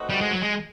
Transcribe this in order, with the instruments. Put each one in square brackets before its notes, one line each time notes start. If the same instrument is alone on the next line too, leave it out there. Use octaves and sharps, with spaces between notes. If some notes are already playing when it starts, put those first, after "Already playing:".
Already playing: [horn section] A3 C4 D#4 F#4 B4
[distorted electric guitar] G3
G#3
F#3
G#3